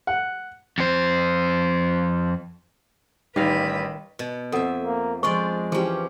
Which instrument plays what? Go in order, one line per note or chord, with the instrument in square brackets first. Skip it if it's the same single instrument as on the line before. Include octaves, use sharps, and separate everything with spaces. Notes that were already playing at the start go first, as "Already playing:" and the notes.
[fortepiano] F#5
[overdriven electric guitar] F2 C5
[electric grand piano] A1 G3 [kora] D#3 F5 [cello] B4
[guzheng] B2
[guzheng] F2 E5 [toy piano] A4 F#5
[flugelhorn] A#3
[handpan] F3 C5 [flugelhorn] G#3 [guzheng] D4 F4 D5 [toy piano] C#6
[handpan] E3 G4 [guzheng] F3 C#4 [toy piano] G#4